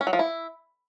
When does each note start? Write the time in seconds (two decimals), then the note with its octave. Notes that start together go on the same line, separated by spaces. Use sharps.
0.01 C#4
0.07 F#3
0.13 F3
0.19 E4